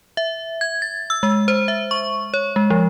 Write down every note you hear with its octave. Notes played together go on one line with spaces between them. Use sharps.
E5
G#6
A6
E6
G#3
C5
E5
C#6
C#5
G#3
F3